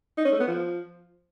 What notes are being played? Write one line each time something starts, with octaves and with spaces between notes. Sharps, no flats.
D#4
C#4
A3
B3
F3